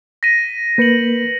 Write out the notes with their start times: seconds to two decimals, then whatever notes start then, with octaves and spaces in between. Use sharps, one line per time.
0.23 A#6 B6 D#7
0.78 A#3 B4 G6 C#7 F#7